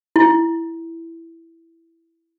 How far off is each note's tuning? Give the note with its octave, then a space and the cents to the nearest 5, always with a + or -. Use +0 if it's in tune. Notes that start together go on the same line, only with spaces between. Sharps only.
E4 +5